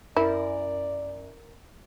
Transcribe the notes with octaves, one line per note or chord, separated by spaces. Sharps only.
F#2 E4 A#4 D5